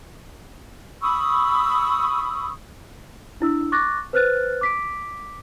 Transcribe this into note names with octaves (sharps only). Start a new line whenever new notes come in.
B5 C#6 D#6 E6
D4 E4 E6
C#6 D6 F#6 A6 A#6
B4 C5 F6 F#6 A6
D6 B6 D7